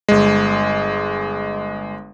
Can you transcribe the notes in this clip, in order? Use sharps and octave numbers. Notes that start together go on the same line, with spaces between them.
G1 G#3